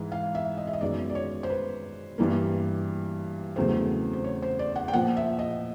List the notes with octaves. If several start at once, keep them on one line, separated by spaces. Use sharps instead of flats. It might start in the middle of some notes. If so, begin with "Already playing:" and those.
Already playing: G#2 E3 G#3
F5
E5
D#5
E5
D#5
F#2 D#3 G#3 B3 D5
D5
C#5
C5
B4
G2 E3 G3 A#3
E2 C#3 F#3 A3 C4 C5
C5
C#5
C5
D5
F#5
G5
A#2 F3 A#3 F#5
E5
D#5